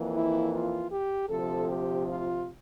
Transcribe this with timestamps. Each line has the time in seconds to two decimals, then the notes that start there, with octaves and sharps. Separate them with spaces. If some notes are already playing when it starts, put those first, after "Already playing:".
Already playing: F2 E3 A#3
0.12 E4
0.51 F4
0.91 G4
1.29 D2 C3 F3 A4
1.68 G4
2.06 F4